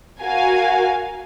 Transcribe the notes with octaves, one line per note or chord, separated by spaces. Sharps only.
F#4 A#4 F5 G#5